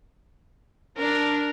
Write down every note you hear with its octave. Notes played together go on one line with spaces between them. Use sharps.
D4 A#4